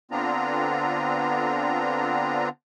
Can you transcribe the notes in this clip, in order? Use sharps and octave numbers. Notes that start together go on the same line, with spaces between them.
D3 B3 C4 D4 F4 A#5